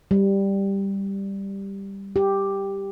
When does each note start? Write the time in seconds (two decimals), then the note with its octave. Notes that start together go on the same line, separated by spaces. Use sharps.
0.11 G3
2.16 G4